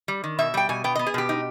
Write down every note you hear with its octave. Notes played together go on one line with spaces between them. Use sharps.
G3
D#3
B2 E5
G3 G5
B2 G#5
B3 G5
B3 D#5
G#4
B2 G4
D#4